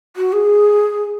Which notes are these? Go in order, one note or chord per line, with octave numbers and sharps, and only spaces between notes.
F#4
G#4